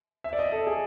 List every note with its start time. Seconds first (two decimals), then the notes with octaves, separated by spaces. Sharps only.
0.24 E5
0.33 D5
0.39 D#5
0.52 A4
0.67 G#4